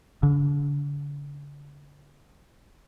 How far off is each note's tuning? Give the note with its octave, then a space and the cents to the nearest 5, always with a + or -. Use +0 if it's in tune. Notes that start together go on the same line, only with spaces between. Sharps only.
D3 -40